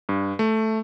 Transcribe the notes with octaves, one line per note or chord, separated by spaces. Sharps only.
G2
A3